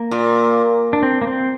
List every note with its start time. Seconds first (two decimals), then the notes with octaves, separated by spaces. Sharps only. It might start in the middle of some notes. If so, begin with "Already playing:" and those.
Already playing: A#3
0.11 A#2
0.93 D4
1.03 C4
1.22 A#3
1.27 C4